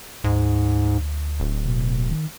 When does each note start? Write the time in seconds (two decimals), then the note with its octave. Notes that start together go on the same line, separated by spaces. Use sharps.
0.24 D2 G#2
1.40 D1
1.65 B2
2.11 D#3